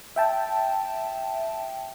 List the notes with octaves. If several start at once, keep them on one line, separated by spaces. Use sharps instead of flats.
E5 G5 A5